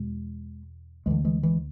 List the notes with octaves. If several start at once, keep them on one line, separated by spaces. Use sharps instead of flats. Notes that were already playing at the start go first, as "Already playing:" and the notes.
Already playing: E2 B2 G#3
D2 D3 E3 G#3
E3 G#3
E3 G#3